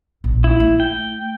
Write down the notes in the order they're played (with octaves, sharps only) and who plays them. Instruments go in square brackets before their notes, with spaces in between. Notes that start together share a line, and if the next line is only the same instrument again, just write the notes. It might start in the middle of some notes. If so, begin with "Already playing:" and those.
[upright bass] A#1
[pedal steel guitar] E4
[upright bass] A3
[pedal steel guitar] G5